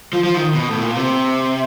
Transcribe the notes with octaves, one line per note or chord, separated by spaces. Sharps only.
F3
F3
D#3
B2
A2
A#2
C3